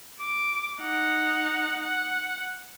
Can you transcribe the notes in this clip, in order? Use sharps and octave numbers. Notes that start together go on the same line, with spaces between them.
D6
D#4 F#5
F#5